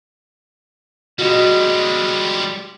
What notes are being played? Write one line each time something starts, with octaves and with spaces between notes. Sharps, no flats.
G3 G#3 F#4 D#5